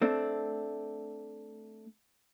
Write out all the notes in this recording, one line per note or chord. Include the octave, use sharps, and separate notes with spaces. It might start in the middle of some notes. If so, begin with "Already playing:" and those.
A3 C4 D4